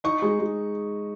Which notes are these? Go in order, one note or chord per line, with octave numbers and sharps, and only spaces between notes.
D#4 C#6
G#3
G#3